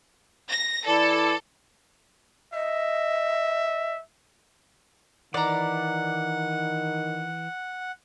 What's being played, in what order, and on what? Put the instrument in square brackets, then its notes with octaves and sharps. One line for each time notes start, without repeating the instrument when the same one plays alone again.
[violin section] A#6
[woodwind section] E3 E4 D5 [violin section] A4
[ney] D#5 [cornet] E5
[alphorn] D#3 [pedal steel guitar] E3 [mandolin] D5 A#5 [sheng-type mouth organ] F#5